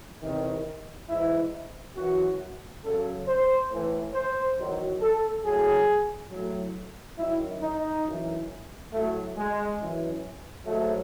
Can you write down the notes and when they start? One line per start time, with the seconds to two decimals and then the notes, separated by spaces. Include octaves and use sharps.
0.23 E2 C3 D#3
1.09 G#2 E3 E4
1.96 F#2 E3 F#4
2.84 F#2 C#3 F#3 A4
3.28 C5
3.70 A2 E3
4.14 C5
4.58 E2 D#3 F#3
5.02 A4
5.44 A2 F#3 G#4
6.32 A2 F#3
7.18 F#2 D#3 F#3 E4
7.62 D#4
8.06 F#2 E3
8.92 A2 F#3 A3
9.37 G#3
9.80 F#2 E3
10.66 G#2 F#3 A3